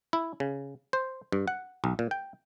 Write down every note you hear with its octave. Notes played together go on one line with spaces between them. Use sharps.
E4
C#3
C5
G2
F#5
B1
A#2
G5